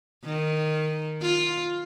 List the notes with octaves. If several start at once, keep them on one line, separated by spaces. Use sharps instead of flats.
D#3
F4